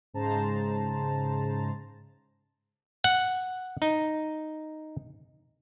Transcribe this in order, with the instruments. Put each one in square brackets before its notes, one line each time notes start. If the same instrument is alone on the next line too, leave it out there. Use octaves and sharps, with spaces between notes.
[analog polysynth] G#2 C#3 G#3 C5 A5 A#5
[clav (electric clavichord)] F#5
D#4